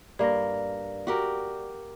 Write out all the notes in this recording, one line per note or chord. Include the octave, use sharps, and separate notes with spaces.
G2 A#3 D5 A#6
F#4 G4 A#4